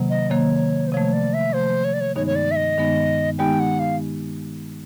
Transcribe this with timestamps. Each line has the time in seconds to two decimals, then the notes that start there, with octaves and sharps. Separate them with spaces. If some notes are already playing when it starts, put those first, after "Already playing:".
Already playing: C3 D#3 F#3 A#3
0.10 D#5
0.30 C3 D#3 F#3 A#3 C#5
0.87 C5
0.92 C3 F3 A3 C#5
1.13 D5
1.34 E5
1.53 C3 F3 A3 C5
1.84 C#5
1.93 D5
2.01 C#5
2.16 G2 D#3 G#3 B3 D#4 C#5
2.27 C#5
2.35 D5
2.51 E5
2.56 D#5
2.78 G2 D#3 G#3 B3 D#4
3.38 D#3 G#3 B3 D#4 G4 G5
3.60 F#5
3.80 F5